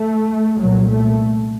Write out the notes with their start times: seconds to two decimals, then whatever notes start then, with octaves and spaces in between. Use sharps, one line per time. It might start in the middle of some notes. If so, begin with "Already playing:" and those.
Already playing: A3
0.60 C2 A#2 F#3
0.89 A3